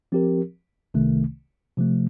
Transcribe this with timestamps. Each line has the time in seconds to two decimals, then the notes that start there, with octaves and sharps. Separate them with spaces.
0.12 F3 C4 G4 A#4
0.94 C2 C3 D#3 A3
1.77 C3 F3 A3